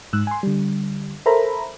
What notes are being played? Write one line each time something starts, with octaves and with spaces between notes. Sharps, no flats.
G#2 E6 F#6
G#5 C6
D3 G3
A4 A#4 C5 E5 A#5 B5